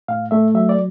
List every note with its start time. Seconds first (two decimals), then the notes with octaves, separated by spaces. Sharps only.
0.08 A2 F5
0.31 A3 E5
0.55 F#3 E5
0.69 D5